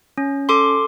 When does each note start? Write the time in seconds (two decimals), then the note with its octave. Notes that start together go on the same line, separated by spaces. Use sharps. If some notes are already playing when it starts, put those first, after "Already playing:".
0.18 C#4
0.49 A4 C6 D6